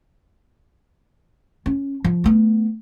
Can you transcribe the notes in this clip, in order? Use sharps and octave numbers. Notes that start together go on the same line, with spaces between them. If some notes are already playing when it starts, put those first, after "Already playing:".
C#4
F3
A3 B3